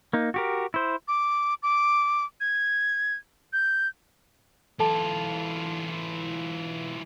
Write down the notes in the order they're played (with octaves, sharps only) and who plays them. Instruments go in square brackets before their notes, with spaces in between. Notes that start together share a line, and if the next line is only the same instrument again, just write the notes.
[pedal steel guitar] A#3 D#4
F#4 G4 A#4
E4 C5
[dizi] D6
D6
G#6
G6
[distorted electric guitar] E3 F4 [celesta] A4 A5